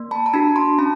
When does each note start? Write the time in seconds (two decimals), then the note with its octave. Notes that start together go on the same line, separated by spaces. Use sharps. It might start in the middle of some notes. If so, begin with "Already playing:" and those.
Already playing: A#3
0.11 A5 B5
0.26 A#5
0.34 D4 F#4 A5 B5
0.56 A#5 C6
0.78 C#4 A5 B5